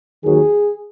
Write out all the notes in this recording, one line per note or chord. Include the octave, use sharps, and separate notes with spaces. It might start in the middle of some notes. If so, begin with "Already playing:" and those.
D#2 D#3 F#3 G#4